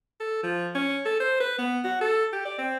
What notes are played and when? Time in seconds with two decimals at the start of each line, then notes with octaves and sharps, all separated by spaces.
0.20 A4
0.43 F3
0.75 C#4
1.05 A4
1.20 C5
1.40 B4
1.58 B3
1.84 F#4
2.01 A4
2.33 G4
2.45 D5
2.58 C4